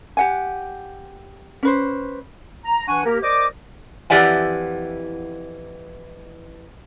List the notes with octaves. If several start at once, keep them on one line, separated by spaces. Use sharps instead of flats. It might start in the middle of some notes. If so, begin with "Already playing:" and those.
G4 F#5 G#5
C#4 B4 C5
A#5
E3 D4 F#5 G#5 C#6
A#3 G4 A#4
A#4 C5 D5 D#5 D6
F2 E3 G4 D5 F#5 G#5